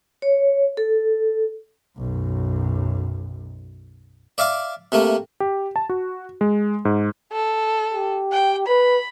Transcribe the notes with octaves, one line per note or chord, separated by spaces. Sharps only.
C#5
A4
B1 F#2
D5 E5 F5 D6
C3 A3 A#3
G4
A5
F#4
G#3
G#2
A4
G4
G5
B4 B5